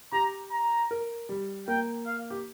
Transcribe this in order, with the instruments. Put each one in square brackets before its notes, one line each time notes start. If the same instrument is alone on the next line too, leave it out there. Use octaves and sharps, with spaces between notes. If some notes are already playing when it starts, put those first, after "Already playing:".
[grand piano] G4 [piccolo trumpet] A#5
[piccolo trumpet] A#5
[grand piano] A#4
G3
[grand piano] A#3 [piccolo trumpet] G5
[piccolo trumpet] F5
[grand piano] G4